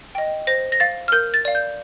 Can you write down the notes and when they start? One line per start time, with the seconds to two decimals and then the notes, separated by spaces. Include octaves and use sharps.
0.15 D#5 G5
0.47 C5 A#6
0.72 A#6
0.80 F5 A6
1.08 F6
1.12 A#4 G6
1.34 A6
1.45 D5 F5
1.55 G6